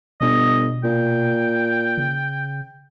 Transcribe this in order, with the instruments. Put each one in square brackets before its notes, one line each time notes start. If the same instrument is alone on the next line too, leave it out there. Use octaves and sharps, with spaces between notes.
[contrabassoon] G1 [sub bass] B2 [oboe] D#5
[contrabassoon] A#2 [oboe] G5
[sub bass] C#3